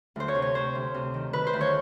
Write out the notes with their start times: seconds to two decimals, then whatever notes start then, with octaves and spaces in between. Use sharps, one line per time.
0.16 D2 C5
0.28 C#5
0.35 C3
0.42 C#5
0.55 C3 C5
0.75 D2
0.94 C3
1.14 D#3
1.33 D#3 B4
1.47 C5
1.53 D2
1.61 C#5